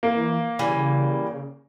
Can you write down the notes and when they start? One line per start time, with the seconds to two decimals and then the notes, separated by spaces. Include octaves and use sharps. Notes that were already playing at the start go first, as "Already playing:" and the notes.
0.03 E3 A#3
0.59 C#3 E3 G3